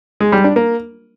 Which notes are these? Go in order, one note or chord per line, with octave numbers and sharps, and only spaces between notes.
G#3
G3
D4
A#3